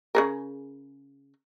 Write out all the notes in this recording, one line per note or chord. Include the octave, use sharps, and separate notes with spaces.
C#3 G#4 A#4